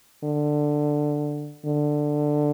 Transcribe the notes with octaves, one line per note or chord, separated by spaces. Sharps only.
D3
D3